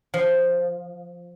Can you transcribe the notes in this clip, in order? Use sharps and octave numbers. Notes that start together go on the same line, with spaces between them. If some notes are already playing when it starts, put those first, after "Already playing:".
F3